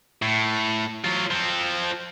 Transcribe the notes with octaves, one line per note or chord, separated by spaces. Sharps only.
A2
F#3 F4
F3 C4